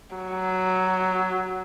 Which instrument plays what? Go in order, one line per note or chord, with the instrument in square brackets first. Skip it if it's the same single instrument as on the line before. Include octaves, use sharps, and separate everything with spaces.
[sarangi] F#3